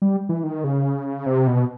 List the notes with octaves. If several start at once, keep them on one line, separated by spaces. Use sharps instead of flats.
G3
E3
D#3
C#3
C3
B2